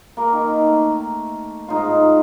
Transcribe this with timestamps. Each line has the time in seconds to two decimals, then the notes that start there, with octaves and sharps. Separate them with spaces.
0.17 A#3 A#4
0.33 D#3
0.66 A3
1.68 G#2 D#4 F4